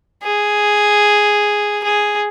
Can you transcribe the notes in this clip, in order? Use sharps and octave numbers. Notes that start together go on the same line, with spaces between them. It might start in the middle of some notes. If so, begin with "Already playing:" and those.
G#4
G#4